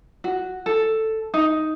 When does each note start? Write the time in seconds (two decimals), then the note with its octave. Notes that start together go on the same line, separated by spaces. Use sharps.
0.24 F#4
0.66 A4
1.34 D#4